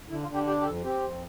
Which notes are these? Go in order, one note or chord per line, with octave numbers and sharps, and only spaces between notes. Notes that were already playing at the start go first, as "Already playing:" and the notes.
D3 E4
F4
D3
G4
D4 G4
G4
F2 A4
C4 G4
F2